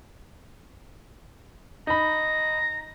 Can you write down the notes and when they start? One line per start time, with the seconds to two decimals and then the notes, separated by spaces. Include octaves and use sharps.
1.87 D#4 A#5 B5